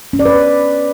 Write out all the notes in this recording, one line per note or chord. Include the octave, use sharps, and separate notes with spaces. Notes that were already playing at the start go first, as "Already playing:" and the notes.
C#4
D5
B4